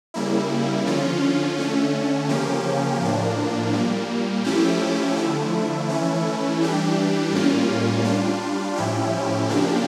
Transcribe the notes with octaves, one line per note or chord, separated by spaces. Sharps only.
C#3 G3 A#3 E4
D3 F3 C#4 F4
D3 A3 C#4
C#3 F3 A#3 C#4 G4
A2 F3 A#3 D4
A#2 G3 A#3
F3 A3 C#4 E4 G4
D3 F3 A3 E4
E3 A3 C#4 E4
E3 G3 D4 G4
A2 G3 A#3 C#4 F4
G3 D4 F4
A2 F3 C#4 E4 G4
C#3 F3 A#3 D4 G4